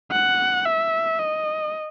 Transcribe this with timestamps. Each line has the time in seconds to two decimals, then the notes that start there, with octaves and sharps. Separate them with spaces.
0.12 F#5
0.65 E5
1.19 D#5